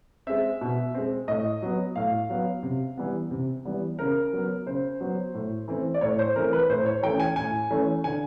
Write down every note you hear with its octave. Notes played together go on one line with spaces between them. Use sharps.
G#3 C4 E5
B2
G#3 C4
A2 D#5
F#3 B3
A2 F5
F#3 B3
C3
E3 G3 B3
C3
E3 G3 B3
C#3 A#4
F#3 B3
C#3 C5
F#3 B3
A2
E3 A3 C4
D5
A2 C#5
C5
E3 A3 C4 A#4
B4
A2 C5
C#5
E3 A3 C#4 G5
G#5
A2 G#5
E3 A3 C#4
D3 G#5